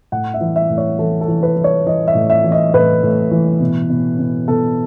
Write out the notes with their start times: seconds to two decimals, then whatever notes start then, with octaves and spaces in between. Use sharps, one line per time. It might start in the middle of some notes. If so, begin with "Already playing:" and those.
0.12 A2 F#5
0.34 E5
0.41 E3
0.56 E5
0.70 A2
0.78 C#5
0.99 E3 A4
1.21 A4
1.28 E3
1.43 B4
1.57 E3
1.64 C#5
1.86 E3 D#5
2.07 E5
2.15 A2
2.30 E5
2.44 E3
2.52 D#5
2.74 A2 B4
3.03 A2
3.31 E3
3.60 B2
3.90 B2
4.19 B2
4.48 B2 A4